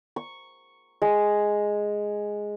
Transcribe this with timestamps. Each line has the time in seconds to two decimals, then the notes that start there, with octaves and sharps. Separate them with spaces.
0.16 C#6
1.02 G#3